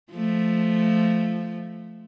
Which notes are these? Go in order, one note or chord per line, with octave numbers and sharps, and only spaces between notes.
F3 A3